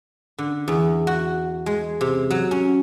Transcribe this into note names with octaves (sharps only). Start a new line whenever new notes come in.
D3
E2
F#4
G#3
C3
F#3
C#4